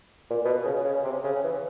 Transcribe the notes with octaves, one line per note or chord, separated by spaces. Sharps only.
A#2
B2
C#3
C#3
C3
C#3
E3